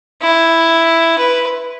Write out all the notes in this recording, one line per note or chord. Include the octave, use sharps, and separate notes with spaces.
E4
B4